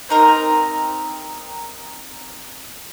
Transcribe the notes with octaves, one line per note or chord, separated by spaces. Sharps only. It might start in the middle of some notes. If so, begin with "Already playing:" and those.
C4 D#4 A#4